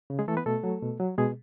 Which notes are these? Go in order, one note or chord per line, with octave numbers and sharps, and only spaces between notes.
C#3
G#3 G#4
E3 A3 A4
B3 B4
B2 A3 A4
F#3
B2
F#3
B2 G#3 G#4